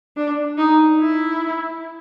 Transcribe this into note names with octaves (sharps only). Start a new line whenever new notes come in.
D4
D#4
E4